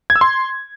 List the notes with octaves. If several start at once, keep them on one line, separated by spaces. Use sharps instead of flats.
G#6
E6
C6